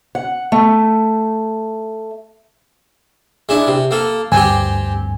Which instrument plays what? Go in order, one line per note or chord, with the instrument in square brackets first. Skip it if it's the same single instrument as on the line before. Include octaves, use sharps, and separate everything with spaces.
[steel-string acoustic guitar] F#5
A3
[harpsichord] G#3 D4 E4
C3
A#3 A4
[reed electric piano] D2 G2 G#5 [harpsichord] C4 G4